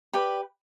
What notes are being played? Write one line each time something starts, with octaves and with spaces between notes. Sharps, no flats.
G4 B4 D5 B5